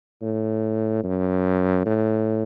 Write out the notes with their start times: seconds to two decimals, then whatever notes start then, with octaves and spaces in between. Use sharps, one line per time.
0.22 A2
1.03 F#2
1.86 A2